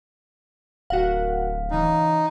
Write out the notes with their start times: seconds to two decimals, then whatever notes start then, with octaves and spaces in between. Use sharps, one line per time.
0.90 D1 F#4 A#4 F5 F#5
1.71 C#3 E3 D#4